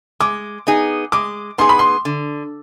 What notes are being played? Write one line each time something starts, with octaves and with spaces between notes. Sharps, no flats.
G#3 D6
B3 D#4 G#4
G#3 D6
B3 D#4 G#4 C6
B5
C6
D3